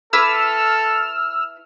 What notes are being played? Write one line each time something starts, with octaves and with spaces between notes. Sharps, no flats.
E4 A4 B4 D6 E6 F6